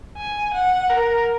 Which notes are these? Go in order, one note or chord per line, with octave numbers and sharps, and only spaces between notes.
G#5
F#5
A#4